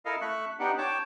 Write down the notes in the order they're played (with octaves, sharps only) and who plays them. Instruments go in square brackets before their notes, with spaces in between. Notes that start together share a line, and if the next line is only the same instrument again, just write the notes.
[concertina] E4 A4 A#4 D#5 F5
A3 E5 C#6 F#6
B3 D4 D#4 G4 F#5
C#5 G5 A5 D6